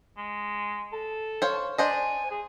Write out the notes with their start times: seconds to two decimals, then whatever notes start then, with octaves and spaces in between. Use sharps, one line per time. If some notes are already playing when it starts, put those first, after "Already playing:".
0.17 G#3
0.93 A4
1.42 C5 C#5 F5
1.78 D4 C5 D#5 G#5
2.31 G#4